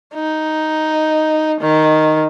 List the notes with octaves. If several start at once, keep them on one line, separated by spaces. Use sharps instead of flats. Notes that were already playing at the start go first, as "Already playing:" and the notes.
D#4
D#3